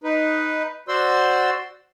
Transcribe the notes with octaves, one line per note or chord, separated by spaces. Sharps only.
D#4 B4
F#4 C5 D5 C6 E6